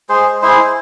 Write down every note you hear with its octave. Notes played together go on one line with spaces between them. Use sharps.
G#3 G#4 C5
G#3
E4 G#4 C5
E4